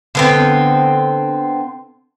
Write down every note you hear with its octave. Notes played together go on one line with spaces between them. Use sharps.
D3 B3 C4